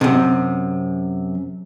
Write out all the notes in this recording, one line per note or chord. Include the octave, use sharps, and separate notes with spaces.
F#2 C3